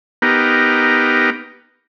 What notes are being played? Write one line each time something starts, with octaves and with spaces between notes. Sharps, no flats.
B3 D#4 G4 A#4